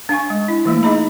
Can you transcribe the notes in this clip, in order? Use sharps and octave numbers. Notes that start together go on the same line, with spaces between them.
D4 F5 G#5 C#6
G#3
E4
E3 A3 A#3 F4
D#4 G#4 D#5 A#5 B5